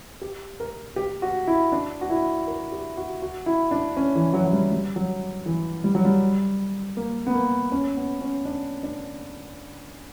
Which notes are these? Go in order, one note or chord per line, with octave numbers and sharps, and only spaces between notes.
G4
A#4
G4
F#4
E4
D4
F#4
E4
A#4
G4
F#4
F#4
E4
D4
C#4
E3
F#3
F#3
G3
G3
F#3
E3
G3
F#3
G3
A#3
B3
A#3
C#4
B3
C#4
D4
D4